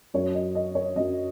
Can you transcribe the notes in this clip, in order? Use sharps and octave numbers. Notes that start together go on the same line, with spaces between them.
F#2 F#3 C#5
D#5
D#5
C#5
F#2 F#3 D#5